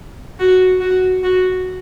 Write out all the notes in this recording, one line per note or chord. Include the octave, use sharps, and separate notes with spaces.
F#4
F#4
F#4